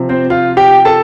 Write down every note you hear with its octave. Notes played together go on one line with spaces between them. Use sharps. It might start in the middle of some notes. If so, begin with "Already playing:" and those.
Already playing: C3 F3
C4 C5
F4 F5
G4 G5
A4 A5